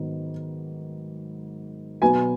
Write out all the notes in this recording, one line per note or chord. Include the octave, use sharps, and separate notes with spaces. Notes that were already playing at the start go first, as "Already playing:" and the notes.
Already playing: G#2 D#3 F#3 B3
B2 F#3 B3 G#5